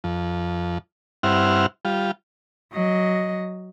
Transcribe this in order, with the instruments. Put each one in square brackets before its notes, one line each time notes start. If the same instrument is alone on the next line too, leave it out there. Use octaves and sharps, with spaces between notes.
[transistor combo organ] F2
G2 C4 E4 F#5 F6
G3 F4
[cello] F#3 D#5